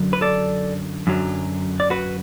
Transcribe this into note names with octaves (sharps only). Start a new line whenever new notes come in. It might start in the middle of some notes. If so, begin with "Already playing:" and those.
Already playing: F#2 D3 F#3
B4
A4 D5
F#2 D3 F#3
D5
F#4 B4